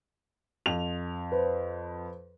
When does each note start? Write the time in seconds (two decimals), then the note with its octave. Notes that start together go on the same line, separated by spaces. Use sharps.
0.66 F2 F7
1.32 B4 C5